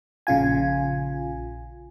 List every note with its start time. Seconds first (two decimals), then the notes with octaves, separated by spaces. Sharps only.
0.27 A#1 C#3 F4 G#5